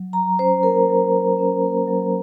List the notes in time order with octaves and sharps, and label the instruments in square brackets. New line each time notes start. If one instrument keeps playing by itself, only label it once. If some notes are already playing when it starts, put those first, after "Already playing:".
Already playing: [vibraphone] F#3
F#3 A#5
C#4 C5
A#3 A#4
F#3
F#3
C#4
A#3
F#3